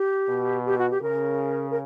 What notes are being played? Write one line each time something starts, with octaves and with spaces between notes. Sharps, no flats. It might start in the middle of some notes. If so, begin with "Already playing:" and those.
Already playing: G4
B2
G4
F#4
G4
C#3 A#4
A#4